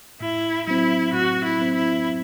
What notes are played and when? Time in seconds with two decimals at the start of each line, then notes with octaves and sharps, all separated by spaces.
0.21 A2 E4
0.66 F#3 C4 E4
1.13 A2 F#4
1.44 E4
1.58 F#3 C4
1.74 E4